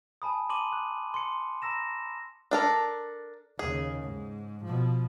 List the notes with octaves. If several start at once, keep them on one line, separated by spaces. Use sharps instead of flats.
G#5 A5 B5 D#6
A5 A#5 C6 D6 D#7 F#7
D#6 F#6
C6 C#7
A#5 B5 E6 A#6 E7
D4 A4 A#4
D#2 C#3 G#4
G#2
B2 F3